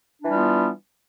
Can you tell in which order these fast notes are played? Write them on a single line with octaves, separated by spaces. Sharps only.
D4 E3 G3 F4 B3